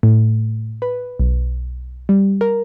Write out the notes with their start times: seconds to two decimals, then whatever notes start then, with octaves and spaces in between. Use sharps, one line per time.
0.03 A2
0.82 B4
1.19 B1
2.09 G3
2.41 A#4